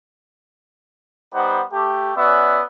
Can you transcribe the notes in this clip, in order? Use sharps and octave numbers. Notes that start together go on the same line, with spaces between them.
G3 B3 D#4 C5 F#5
A3 G4
B3 C#4 F#4 D5 E5